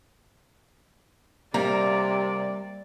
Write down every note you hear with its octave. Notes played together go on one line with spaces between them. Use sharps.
C3 G3 A#3 D5 A#5